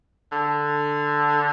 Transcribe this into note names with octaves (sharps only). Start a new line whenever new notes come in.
D3